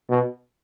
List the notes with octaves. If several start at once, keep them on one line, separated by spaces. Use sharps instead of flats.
B2